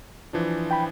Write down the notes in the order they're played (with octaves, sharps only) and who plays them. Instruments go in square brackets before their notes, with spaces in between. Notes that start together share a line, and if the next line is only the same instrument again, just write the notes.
[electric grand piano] E3 F3 D4
[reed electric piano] G5 B5